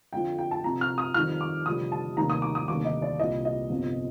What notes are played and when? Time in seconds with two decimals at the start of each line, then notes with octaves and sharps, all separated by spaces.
0.13 F2 D3 F3 G5
0.38 G5
0.51 A5
0.63 F2 C3 F3 A#5
0.81 F6
0.98 D#6
1.14 F2 D#3 G3 F6
1.41 D6
1.66 F1 F2 D3 G3 D#6
1.92 A5
2.17 F1 D#2 D#3 G3 A#5
2.30 D#6
2.42 D6
2.55 D#6
2.68 F1 D#2 D3 G3 D6
2.85 D#5
3.02 D5
3.19 C2 A#2 G3 D#5
3.45 D#5
3.70 G1 F2 C3